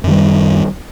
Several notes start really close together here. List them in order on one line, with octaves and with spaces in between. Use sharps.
F#2 D#3 G3